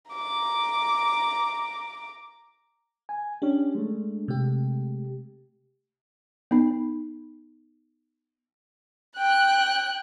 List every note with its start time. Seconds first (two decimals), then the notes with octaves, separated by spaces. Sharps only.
0.12 A#5 D6
3.09 G#5
3.42 C#4 D4 G4
3.75 G#3 A3
4.28 C3 G4
6.51 B3 D#4
9.19 G5 F#6